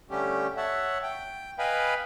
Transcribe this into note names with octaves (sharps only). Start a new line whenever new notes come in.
D3 G3 A3 C#4 G4
C#5 E5 F#5 A5
G5
B4 D#5 F5 G5 G#5 B5